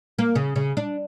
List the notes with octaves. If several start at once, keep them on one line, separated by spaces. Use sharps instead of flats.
A#3
C#3
C#3
D4